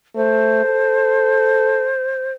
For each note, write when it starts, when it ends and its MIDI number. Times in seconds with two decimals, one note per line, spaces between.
0.15 0.62 57
0.15 2.31 72
0.65 1.92 69